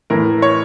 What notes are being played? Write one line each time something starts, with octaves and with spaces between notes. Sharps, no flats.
A2 E3 A#4
C#5